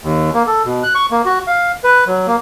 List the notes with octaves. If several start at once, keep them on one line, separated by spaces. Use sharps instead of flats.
D#2
A#3
A4
B2
F#6
C#6
A#3
F#4
F5
B4
F#3
A#3